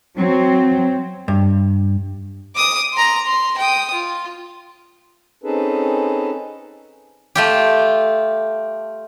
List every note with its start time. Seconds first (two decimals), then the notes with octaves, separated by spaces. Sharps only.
0.16 F#3 C4
1.28 G2
2.55 D6 D#6
2.93 A#5 C6
3.25 C6
3.58 G5 D#6
3.93 F4
5.44 C4 C#4 D#4 G#4 A4 B4
7.35 A3 F4 G4